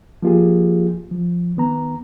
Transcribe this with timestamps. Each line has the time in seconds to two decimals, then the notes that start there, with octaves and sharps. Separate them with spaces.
0.23 F3 A#3 F4 G4 G#4
1.11 F3
1.57 D#3 B3 A#5